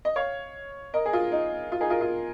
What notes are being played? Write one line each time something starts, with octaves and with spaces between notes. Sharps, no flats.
D#5
C#5 F5
A#4 D#5
G#4
F4
D#4
F4
D#4 G#4
F4 A#4
F4